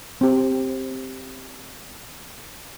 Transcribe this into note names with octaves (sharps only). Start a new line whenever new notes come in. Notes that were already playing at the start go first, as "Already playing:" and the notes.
C4 G4